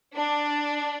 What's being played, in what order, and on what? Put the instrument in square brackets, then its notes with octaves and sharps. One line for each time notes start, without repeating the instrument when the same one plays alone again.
[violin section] D4